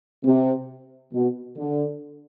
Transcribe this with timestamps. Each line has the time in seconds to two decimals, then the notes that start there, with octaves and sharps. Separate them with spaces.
0.24 C3
1.13 B2
1.57 D3